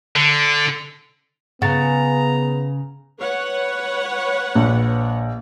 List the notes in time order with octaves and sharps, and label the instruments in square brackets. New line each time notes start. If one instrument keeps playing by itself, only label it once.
[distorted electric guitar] D3
[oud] C#3 [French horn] B3 [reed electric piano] F#5 A6 [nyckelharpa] A#5
[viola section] B4 C#5 F#5
[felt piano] A#1